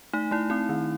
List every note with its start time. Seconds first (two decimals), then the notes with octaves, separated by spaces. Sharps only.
0.13 A3 D#4
0.31 A3 E4
0.50 C4 E4
0.69 D#3